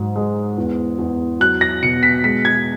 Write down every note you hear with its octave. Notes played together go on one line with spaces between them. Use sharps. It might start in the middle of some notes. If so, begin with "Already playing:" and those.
Already playing: G#2 F#3
G#3
E2
E2
F#3 F#6
A#6
B2 C#7
B6
G#3 B6
G#6